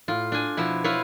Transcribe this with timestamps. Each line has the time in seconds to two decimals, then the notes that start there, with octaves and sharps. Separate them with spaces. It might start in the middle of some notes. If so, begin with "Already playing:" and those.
0.08 A2 F4
0.32 D4 G#5
0.57 B2 F3 E4
0.84 E4 F4 B4 C#5